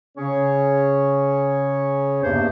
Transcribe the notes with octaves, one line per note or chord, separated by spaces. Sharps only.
C#3 C#4 G#4 C#5
E2 G2 C3 A#3 C5